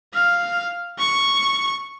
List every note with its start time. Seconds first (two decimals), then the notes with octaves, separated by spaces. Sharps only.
0.14 F5
0.99 C#6